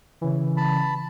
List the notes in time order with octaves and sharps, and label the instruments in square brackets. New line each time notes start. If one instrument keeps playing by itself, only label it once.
[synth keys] C#3 E3
[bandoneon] A5 B5